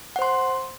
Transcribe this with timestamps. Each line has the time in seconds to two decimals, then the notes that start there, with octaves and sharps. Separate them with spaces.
0.16 F#5
0.19 C5
0.22 C6